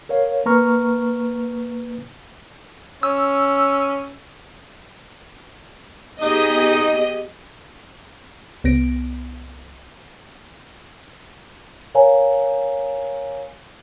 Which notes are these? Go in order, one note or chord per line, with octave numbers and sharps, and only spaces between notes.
A#4 C#5 F5
A#3 B4 A#5 C#6 F6
C#4 E6
B3 D#4 G4 G#4 D#5
C2 B3 A#6 D7
A#4 C#5 F5 G#5 A#5